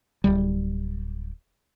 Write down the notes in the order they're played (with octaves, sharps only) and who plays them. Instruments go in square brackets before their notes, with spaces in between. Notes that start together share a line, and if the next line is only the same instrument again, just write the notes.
[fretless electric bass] D1 G1 G3